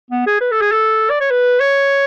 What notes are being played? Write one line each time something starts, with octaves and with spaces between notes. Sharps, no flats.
B3
G#4
B4
A4
G#4
A4
D5
C#5
B4
C#5